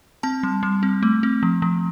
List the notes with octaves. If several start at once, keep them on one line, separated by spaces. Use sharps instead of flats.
C4 A5
G3
G3
C4
A3
C4
F3
F3